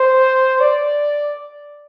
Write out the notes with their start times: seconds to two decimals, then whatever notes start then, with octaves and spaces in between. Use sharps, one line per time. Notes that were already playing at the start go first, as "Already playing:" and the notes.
Already playing: C5
0.61 D5